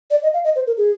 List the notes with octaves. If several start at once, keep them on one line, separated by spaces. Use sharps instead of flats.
D5
D#5
F5
D#5
C5
A#4
G#4